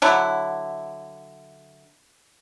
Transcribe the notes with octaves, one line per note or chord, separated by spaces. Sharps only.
D3 F#3 E4